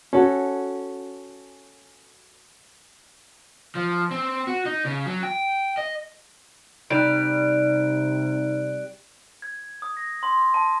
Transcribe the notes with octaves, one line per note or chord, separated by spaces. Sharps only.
C#4 F#4 A4
F3
C4
F#4
D#4
C#3
F#3
G5
D#5
C3 G3 D#4 F#6 D7
G#6
D#6
A#6
C6
A5